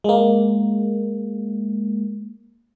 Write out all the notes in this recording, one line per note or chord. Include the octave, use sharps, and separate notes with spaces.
G#3 A#3